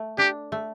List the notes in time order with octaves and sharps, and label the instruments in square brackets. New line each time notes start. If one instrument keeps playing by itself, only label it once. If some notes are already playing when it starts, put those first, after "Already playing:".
Already playing: [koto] A3
[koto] D4 [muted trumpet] G4
[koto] A3